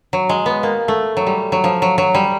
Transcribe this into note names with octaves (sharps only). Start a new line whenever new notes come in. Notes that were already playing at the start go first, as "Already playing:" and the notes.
F#3
G#3
B3
A#3
A3
F#3
G3
F#3
F3
F#3
F#3
G3